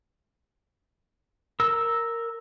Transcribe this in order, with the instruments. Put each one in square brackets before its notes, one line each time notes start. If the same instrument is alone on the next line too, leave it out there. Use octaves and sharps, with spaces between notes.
[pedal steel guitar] A#4 E6